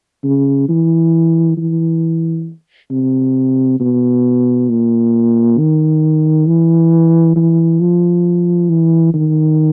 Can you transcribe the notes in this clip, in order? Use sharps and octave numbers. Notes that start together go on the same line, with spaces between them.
C#3
E3
E3
C3
B2
A#2
D#3
E3
E3
F3
E3
D#3